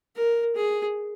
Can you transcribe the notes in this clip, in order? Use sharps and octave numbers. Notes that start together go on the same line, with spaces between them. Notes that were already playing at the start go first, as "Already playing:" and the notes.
A#4
G#4